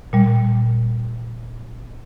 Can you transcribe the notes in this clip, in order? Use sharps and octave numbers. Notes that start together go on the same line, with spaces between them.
A#2 G3